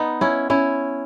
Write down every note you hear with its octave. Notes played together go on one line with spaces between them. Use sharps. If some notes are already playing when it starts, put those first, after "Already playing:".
Already playing: B3 D#4
C#4 E4
C#4 E4